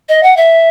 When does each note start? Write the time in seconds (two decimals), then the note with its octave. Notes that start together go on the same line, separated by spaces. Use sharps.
0.09 D#5
0.23 F#5
0.37 E5